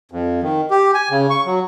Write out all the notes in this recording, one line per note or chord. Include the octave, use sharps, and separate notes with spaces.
F2
D#3
G4
G#5
C#3
C#6
F#3